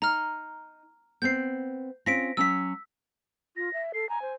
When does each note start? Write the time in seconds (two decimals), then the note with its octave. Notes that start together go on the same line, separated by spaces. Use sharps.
0.02 D#4 A#5 F6
1.22 B3 C4 G6 C7
2.06 C4 C#4 F4 A#6 B6 D7
2.37 F#3 C#4 F#4 E6 B6
3.57 F4 A#6
3.73 E5
3.94 A4 C7
4.09 G#5 A#5
4.22 C5